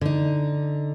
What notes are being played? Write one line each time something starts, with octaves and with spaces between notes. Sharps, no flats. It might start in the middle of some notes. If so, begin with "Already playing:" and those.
D3 D#4